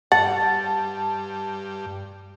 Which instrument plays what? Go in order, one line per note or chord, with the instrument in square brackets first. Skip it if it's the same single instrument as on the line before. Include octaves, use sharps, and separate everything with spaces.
[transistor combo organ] G2 [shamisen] F#5 [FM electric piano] A5 [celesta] A6